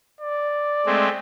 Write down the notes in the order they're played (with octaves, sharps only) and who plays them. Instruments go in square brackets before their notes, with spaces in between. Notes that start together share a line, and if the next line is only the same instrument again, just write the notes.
[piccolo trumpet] D5
[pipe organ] G#3 A3 C4